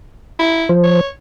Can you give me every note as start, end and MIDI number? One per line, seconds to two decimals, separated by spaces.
0.39 0.66 64
0.69 1.01 53
0.69 1.01 72
0.83 1.07 73